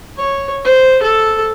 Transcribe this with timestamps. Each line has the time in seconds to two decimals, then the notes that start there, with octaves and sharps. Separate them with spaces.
0.17 C#5
0.64 C5
1.02 A4